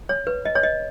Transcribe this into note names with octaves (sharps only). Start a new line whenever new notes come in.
C#5
B4
D#5
C#5
D#5